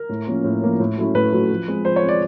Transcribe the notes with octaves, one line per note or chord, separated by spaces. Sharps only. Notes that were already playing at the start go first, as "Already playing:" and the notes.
Already playing: A#4
A2
F3 A#3 C#4
A2
F3 A#3 C#4
A2
F#3 A3 C#4 E4
A2 B4
F#3 A3 C#4 E4
F3
G#3 C4
F3 C5
C#5
G#3 C4
D5